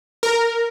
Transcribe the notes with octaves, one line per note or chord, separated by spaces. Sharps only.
A#4